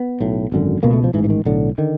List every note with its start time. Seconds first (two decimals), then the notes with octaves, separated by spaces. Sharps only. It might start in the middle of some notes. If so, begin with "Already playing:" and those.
Already playing: B3
0.20 B1 A2
0.52 G#1 F#2 D3
0.83 C#2 B2 A#3
0.93 A3
1.04 F3
1.14 G#2 E3
1.18 A1
1.24 E3
1.30 D#3
1.45 B1 A2 D3
1.78 D3 D#3